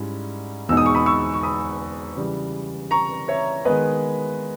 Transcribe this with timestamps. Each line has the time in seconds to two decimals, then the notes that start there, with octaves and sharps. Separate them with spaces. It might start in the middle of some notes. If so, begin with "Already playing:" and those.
Already playing: G#2 G3 C#4 E4
0.69 E2 B2 G#3 D#4 E6
0.77 D#6
0.86 C#6
0.95 B5 D#6
1.06 C#6 E6
1.33 C#6
1.43 B5 D#6
2.17 C#3 E3 G3
2.91 A#5 C#6
3.28 C#5 E5
3.65 D#3 G#3 B3 B4 D#5